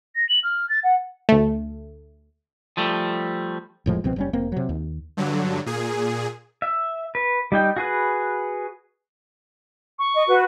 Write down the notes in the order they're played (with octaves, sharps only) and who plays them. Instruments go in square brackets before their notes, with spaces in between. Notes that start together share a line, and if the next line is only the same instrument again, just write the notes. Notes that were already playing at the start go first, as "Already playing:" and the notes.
[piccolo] A#6
F#7
F6
A6
F#5
[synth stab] D2 A3
[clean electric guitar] F3 G3 A3
[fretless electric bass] F1 A2 F3 G#3
C2 B2 F3 C4
F#1 G3 C#4
F1 A#3 C4
C3 F#3
D#2
[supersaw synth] G2 D3 F#3
A#2 G#4
[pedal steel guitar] E5
B4
G3 D#4 G5
F#4 G#4 B4
[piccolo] C#6
[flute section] D#5
F#4 B4